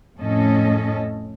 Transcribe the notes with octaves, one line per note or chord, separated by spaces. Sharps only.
F2 A2 C#4 A4 D#5